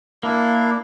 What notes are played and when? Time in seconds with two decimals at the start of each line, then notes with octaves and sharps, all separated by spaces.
0.23 A#3 D4 E4